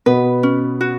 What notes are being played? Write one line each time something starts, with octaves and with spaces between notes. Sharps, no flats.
B2 B3 B4
C#4
F#4